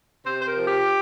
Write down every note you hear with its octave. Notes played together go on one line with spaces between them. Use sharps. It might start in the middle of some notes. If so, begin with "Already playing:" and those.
C3 C5
C5
A#4
F3
G4